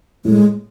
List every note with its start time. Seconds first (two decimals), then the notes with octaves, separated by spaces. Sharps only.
0.25 A2 G#3